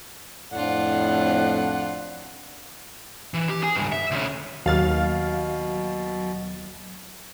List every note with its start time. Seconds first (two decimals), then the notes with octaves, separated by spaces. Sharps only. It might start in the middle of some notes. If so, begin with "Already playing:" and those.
0.53 F2 A2 D4 F4 F#5
3.34 E3
3.49 G4
3.63 G#4 G#5
3.75 C#2 G2
3.92 E5
4.11 D2 C#4
4.66 D#2 B2 F#3 F5 F6 A6